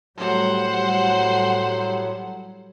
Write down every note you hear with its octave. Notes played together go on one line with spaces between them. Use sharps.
A2 F#3 G3 C5 F#5